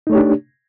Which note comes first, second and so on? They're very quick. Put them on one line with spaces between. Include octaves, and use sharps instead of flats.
D#4 A3 C#5 G4 D4